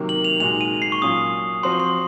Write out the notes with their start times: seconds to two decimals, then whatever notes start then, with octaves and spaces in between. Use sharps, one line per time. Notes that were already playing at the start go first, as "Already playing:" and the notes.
Already playing: C3 D#3 F#3 A#3
0.09 F#7
0.24 F7
0.40 A#2 G#3 D#4 F#4 F7
0.61 D#7
0.82 C7
0.92 C#6
1.02 A#2 F#3 C#4 F4 D#6
1.63 F3 C4 F#4 C6
1.72 C#6
1.80 C6